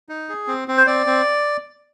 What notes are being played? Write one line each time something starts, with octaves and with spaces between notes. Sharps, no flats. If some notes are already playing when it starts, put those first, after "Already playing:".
D#4
G#4
C4
C4
C5
C4 D5
C4